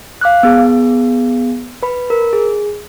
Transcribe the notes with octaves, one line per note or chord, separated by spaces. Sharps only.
F5 D6 F6 F#6
B3 G#4
B4 B5
A#4
G#4